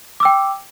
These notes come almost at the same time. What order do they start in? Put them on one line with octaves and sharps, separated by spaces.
D6 E6 G5